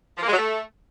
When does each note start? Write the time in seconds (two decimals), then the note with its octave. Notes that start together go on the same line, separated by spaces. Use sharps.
0.18 F3
0.23 A#3
0.28 G#3
0.33 F#3
0.38 A3